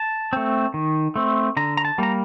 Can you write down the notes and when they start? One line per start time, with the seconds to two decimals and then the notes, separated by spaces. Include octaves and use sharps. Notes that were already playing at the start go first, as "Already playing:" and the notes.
Already playing: A5
0.33 A3 C4
0.74 D#3
1.16 A3 C4
1.57 D3 A#5
1.77 A#5
1.85 A5
1.98 G3 A#3 A#5